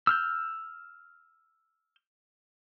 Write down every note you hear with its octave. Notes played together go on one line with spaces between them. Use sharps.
E6 F6 G6